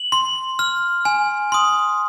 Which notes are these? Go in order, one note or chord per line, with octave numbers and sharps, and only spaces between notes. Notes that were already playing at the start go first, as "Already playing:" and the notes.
Already playing: F#7
C6
F6
G#5
C6 D#6